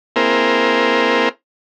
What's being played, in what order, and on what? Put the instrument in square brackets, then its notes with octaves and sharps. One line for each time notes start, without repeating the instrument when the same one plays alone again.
[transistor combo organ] A#3 C4 E4 G#4 A#4 C5